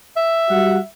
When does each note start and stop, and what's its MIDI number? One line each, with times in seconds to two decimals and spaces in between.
0.16 0.87 76
0.50 0.78 55
0.50 0.78 66
0.50 0.78 78